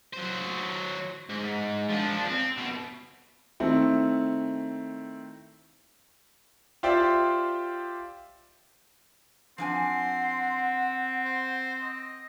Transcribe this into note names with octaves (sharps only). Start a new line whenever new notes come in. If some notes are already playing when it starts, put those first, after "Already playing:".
F#3 C5
G#2
F3 D4
C4
C2 B2
D#3 A3 C4 E4
F4 G4 C5 D5 E5 G5
F3 C4 D4 F#5 G#5 C6
C5
D#5